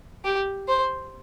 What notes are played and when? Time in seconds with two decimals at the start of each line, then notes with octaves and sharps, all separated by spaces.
0.25 G4
0.68 C5